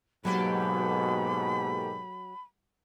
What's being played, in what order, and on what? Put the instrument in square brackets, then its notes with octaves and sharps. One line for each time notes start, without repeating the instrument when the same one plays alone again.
[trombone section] G#2 B2 [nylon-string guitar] F#3 [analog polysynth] A#3 G4 A4 [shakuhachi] B5